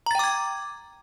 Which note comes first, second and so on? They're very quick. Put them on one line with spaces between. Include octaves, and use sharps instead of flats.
A#5 A6 G5 D6 G#6